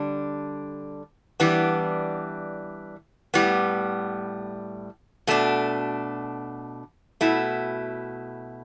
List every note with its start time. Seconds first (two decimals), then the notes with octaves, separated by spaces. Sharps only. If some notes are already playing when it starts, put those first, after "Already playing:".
Already playing: D3 G3 D4
1.40 E3 G3 B3 D4
3.34 A2 G3 B3
5.27 B2 A3 D4
7.21 B2 A3 E4